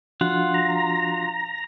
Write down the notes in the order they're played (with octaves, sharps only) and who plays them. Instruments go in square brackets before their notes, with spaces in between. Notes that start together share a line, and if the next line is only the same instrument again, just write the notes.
[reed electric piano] F3 D4 F#4 [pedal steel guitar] F4 F#5
[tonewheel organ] A#5